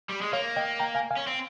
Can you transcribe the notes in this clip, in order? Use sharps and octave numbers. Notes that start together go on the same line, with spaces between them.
G3
G#3
A#3 C#5 F5
D#5 G5
G5 A#5
F5 G#5
F5 G#5
C#4
C4